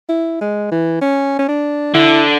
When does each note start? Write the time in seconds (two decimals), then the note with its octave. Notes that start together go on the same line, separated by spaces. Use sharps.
0.09 E4
0.40 G#3
0.71 E3
1.01 C#4
1.39 C#4
1.48 D4
1.94 D3 E4